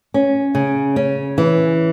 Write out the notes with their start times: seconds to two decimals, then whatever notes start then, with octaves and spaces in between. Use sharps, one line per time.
0.14 C#4
0.55 C#3
0.96 C#4
1.38 E3